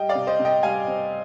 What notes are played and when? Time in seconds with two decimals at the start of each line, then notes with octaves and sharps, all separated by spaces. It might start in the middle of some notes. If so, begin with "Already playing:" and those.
Already playing: G3 D#5 G5
0.09 D5 F5
0.15 C3
0.27 C5 D#5
0.39 C3
0.45 D#5 G5
0.63 G3 F5 G#5
0.87 C4